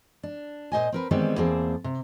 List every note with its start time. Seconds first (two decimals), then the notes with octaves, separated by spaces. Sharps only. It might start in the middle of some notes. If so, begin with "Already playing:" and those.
0.23 D4
0.72 A#2 C5 D#5 G#5
0.92 C4 A#4 B4
1.11 D#3 E3 G3 G#3 B3 C4
1.37 E2 A#3 C4 G#4 A5
1.84 C3